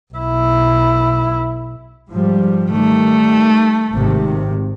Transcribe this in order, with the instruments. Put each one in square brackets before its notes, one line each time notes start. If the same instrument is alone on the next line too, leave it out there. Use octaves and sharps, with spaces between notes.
[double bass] B1 E4
[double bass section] G#2 F3 G3
[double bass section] D#3 G3 [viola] A3
[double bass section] G#1 C3 D#3